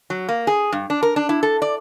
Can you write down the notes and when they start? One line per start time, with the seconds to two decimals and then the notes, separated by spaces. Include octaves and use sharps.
0.10 F#3
0.29 A#3
0.47 G#4
0.72 G2
0.90 D4
1.03 A#4
1.16 D4
1.29 E4
1.43 A4
1.62 D5